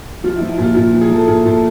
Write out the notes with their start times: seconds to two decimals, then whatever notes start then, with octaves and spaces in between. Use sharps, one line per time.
0.24 F3 F4
0.36 E4
0.41 F3
0.49 E4
0.58 A#2 F4
0.75 A#2 F4
0.93 F3
1.01 G#4
1.10 F3 A4
1.28 A#2 G#4
1.45 A#2 A4